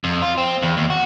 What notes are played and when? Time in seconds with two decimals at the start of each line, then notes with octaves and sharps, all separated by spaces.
0.04 F2
0.22 F4
0.38 C4
0.63 E2
0.77 D#2
0.90 F#4